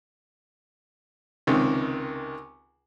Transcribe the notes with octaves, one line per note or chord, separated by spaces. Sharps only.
C#2 C3 D#3